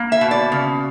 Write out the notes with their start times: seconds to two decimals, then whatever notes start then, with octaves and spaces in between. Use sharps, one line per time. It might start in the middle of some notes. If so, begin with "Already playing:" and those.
Already playing: A#3
0.12 E5
0.21 B2
0.31 D5
0.52 C#3